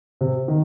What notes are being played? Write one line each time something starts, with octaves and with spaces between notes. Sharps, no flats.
C3
D#3